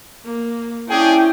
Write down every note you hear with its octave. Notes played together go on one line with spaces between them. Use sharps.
A#3
C#4 D4 E4 G#4 G5 D6